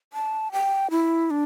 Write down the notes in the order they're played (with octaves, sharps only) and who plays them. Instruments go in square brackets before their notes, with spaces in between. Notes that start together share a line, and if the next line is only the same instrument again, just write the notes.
[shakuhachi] A5
G5
E4
D4